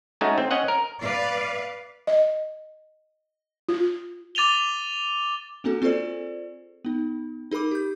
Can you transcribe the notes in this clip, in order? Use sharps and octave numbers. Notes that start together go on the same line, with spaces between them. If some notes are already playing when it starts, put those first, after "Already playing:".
G#3 A3 C#4 D#4 F#4
C4
C#4 D#5 F#5
A#4
B4 D5 F5
D#5
F4
D6 A6 D#7 F7 G7
A#3 C4 D4 F#4 A4
C4 F4 G#4 A4 C5 D5
B3 D#4
D#4 G#4 A#4 B5 D6
G4 G6